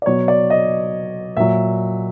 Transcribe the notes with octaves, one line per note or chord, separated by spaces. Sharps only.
D5
B2 F#3 C#5
D5
D#5
A#2 F#3 E5